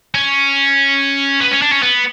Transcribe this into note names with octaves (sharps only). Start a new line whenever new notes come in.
C#4
B3
C#4
D4
C#4
B3